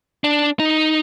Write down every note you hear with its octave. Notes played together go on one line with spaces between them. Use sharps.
D4
D#4